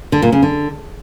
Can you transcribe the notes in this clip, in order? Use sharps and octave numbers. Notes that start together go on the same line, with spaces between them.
D3
A#2
C#3
D3